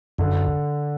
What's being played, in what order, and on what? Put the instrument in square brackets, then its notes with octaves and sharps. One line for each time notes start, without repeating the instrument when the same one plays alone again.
[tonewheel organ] F#2 [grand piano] D3